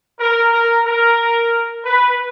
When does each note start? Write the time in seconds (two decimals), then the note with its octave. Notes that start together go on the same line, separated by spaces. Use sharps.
0.19 A#4
0.52 A#4
0.84 A#4
1.84 B4